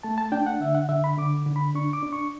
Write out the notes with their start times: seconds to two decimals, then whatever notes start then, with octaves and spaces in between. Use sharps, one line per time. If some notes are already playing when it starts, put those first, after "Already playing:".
0.03 A3 A5
0.18 A5
0.32 D4 G5
0.46 F#5
0.60 D3 E5
0.75 F#5
0.89 D3 E5
1.04 B5
1.17 D3 D6
1.46 D3
1.56 B5
1.75 D4 C#6
1.93 D6
2.03 D4
2.13 C#6